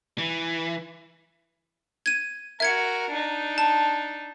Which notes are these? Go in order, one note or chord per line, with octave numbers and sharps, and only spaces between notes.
E3
G#6 D#7
F#4 A#4 E5 G#6 C#7
D4 D#4
A5